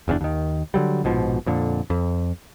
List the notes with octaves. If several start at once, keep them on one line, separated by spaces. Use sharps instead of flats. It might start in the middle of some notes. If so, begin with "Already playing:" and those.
F#1 E2 A#2 D4
D#2 D#3
D3 F#3 G3
A#1 G#2 B2 F3
F2 A#2 D3
F2